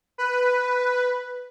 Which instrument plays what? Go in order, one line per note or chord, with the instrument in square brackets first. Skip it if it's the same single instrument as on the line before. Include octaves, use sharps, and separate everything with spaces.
[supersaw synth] B4